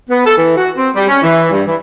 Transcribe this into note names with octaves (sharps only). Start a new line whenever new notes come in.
B3
A4
E3
F#4
C4
G3
C#4
E3
G2
E3